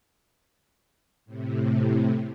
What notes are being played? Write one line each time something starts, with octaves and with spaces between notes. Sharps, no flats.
A2 C3